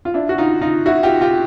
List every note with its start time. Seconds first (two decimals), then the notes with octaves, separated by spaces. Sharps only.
0.05 F4
0.14 D4 E4
0.29 F#4
0.38 D#4 F4
0.61 D#4 F4
0.86 E4 F#4
1.03 F4 G4
1.21 F4 G4